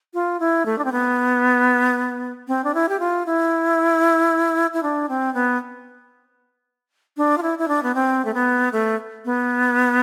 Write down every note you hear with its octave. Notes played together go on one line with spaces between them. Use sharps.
F4
E4
A3
D4
C4
B3
C4
D4
E4
G4
F4
E4
E4
D4
C4
B3
D4
F4
E4
E4
D4
B3
C4
A3
B3
A3
B3